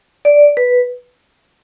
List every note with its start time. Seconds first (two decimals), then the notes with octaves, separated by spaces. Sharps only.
0.25 D5
0.57 B4